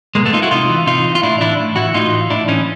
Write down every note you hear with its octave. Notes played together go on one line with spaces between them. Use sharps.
B2 G#3 A#3
A3 B3
D#4 F4
E4 F#4
C3 D#4 F4
E3
C3 D#4 F4
E3
F4
A2 D4 E4
E3 D4 E4
A2
E3 E4 F#4
A2 D#4 F4
E3
A2 D4 E4
E3 C#4 D#4